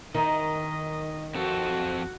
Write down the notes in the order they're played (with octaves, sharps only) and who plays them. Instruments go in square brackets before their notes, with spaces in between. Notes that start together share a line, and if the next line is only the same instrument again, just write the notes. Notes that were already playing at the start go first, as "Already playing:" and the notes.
[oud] D#3 [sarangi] D#5
[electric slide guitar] F2 C4 A4 [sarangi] F#4